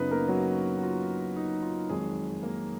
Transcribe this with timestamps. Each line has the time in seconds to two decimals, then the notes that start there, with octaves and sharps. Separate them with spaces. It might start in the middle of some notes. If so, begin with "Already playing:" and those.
Already playing: F#2 C#3 F#3 B3 D#4 B4 D#5
0.11 A#3 A#4
0.28 F#3 F#4
0.78 F#4
0.82 F4
1.36 D#4
1.62 F4
1.89 F2 D#3 F#3 G#3 G#4
2.43 A#3 A#4